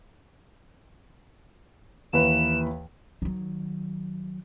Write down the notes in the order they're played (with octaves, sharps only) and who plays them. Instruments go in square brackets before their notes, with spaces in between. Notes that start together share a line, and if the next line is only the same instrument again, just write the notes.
[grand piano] D#2 E3 B4 [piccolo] E7
[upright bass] D#3 F#3